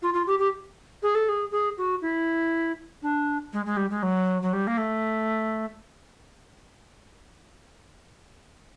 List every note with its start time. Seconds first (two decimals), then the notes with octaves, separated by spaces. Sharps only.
0.02 F4
0.14 F4
0.27 G4
0.39 G4
1.02 G#4
1.15 A4
1.28 G#4
1.51 G#4
1.77 F#4
2.02 E4
3.02 D4
3.53 G#3
3.65 G#3
3.77 G3
3.90 G#3
4.02 F#3
4.42 F#3
4.53 G3
4.67 A#3
4.77 A3